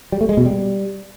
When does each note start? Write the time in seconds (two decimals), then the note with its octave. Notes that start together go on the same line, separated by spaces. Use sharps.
0.12 G3
0.21 A3
0.29 G#3
0.37 B2
0.45 G3